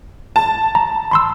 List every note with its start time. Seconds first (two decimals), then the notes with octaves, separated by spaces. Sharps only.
0.36 A5
0.75 A#5
1.11 B5 C6 E6